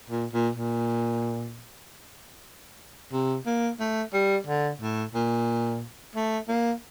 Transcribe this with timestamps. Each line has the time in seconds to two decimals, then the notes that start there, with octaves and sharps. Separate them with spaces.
0.10 A#2
0.33 A#2
0.55 A#2
3.12 C3
3.46 A#3
3.79 A3
4.13 G3
4.47 D3
4.81 A2
5.15 A#2
6.15 A3
6.48 A#3